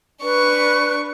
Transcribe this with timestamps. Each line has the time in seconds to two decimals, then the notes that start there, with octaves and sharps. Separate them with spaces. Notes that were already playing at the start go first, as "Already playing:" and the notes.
0.22 D4 B4 C#6